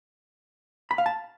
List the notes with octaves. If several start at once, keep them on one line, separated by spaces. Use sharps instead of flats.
B5
F5
A5